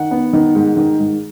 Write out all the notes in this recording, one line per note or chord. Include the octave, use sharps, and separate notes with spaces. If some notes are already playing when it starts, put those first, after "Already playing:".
Already playing: D#3 F#5
B3
D#3
G#2
D#3
G#2